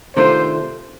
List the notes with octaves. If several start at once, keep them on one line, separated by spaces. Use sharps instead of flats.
C3 D#3 A3 D4 F4 C5